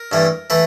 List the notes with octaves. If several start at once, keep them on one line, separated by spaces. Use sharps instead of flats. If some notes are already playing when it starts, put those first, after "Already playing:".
Already playing: A#4
G2 E3 A3
E3 A3 B4